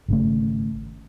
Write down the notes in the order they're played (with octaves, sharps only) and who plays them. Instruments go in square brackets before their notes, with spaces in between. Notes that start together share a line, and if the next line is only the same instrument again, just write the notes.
[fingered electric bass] G#1 C#3 A3